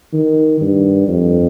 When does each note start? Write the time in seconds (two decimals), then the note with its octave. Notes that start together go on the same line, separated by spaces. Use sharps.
0.14 D#3
0.61 G2
1.08 F2